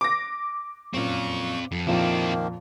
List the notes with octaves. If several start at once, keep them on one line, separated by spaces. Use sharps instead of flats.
D6 A#6
F#2 A#2 C4 F5 C#6
F2
F2 A#2 D#3 F3 A#3 C4 E4